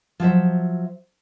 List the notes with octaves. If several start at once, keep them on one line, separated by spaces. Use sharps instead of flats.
F3 F#3 C5 E5